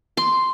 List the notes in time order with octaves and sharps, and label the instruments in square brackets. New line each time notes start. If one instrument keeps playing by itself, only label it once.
[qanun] C6